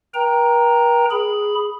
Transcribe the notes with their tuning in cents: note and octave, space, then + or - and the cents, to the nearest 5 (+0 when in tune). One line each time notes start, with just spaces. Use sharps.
A#4 +45 G5 +0 A#5 +0
G#4 +0 B5 +0